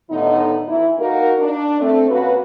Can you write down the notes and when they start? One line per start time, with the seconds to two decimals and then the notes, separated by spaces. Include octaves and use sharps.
0.10 D#2 A2 D3 B3 D#4
0.68 E3 E4
0.98 A#3 D#4 F#4 A#4
1.38 D4
1.80 A3 C4
2.09 C#3 A#3 F#4 B4